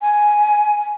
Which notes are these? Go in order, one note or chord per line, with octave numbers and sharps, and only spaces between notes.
G#5